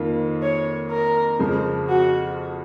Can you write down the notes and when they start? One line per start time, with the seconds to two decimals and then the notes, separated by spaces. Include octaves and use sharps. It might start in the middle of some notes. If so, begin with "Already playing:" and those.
Already playing: F2 D#3 A#3 F4
0.42 C#5
0.91 A#4
1.39 F2 C#3 F3 C4
1.89 F#4